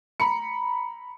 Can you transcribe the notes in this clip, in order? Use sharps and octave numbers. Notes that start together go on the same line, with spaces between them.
A#5 B5 C#7